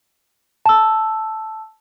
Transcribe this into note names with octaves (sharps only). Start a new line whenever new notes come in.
A5 E6